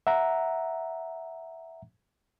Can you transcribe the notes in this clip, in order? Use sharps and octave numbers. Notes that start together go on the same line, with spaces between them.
E5 F#5 A#5